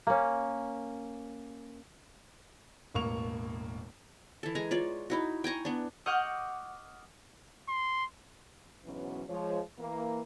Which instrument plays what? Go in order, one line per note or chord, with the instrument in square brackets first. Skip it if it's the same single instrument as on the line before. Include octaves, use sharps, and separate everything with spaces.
[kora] A#3 C#4
[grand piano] E1 A1 A#3 C#6 F7
[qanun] E3 A4
G#3 G#5 A#5
F4 C#5 D5
D#4 E4 F#4
G5 G#5 A#5 C#6
B3 D4
[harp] D#5 F#5 C#6 D6 F6 G6
[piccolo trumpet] C6
[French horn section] G#2 B2 E3 F#3 B3 C#4
F3 G#3 C#5
E3 A#3 A#4